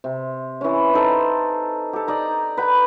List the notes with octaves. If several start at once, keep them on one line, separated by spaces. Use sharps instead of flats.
C3
E3 C#4
D#4 A4 C5
G4 A4
D#4 D5 A#5
B4 G5